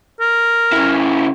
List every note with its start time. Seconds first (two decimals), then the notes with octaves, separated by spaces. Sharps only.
0.20 A#4
0.72 C#3 E4